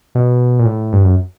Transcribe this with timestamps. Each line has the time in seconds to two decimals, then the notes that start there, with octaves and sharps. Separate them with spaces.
0.15 B2
0.59 A#2
0.65 A2
0.93 G2
1.04 F#2